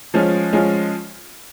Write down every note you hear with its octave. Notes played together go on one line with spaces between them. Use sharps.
F3 G#3 C#4 F4
F3 G#3 C#4 F4